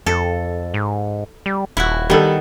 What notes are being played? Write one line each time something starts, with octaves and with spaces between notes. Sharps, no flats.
F2 A4
G#2
G3
D#1 E4 F#4
D#3 G3 B3 A4